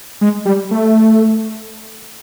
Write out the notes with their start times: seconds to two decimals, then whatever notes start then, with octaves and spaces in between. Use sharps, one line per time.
0.21 G#3
0.45 G3
0.71 A3